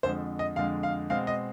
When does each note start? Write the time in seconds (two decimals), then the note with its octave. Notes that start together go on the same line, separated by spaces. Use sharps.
0.03 F2 D3 G#3 C5
0.39 D#5
0.56 F2 D3 G#3 F5
0.83 F5
1.10 B2 G#3 C4 F5
1.27 D#5